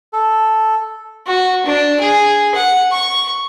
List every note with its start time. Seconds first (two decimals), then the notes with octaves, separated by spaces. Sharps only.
0.13 A4
1.27 F#4
1.66 D4
2.00 G#4
2.54 F#5
2.92 C#6